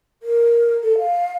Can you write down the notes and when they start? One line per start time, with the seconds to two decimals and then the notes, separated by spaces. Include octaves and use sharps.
0.23 A#4
0.83 A4
0.98 F5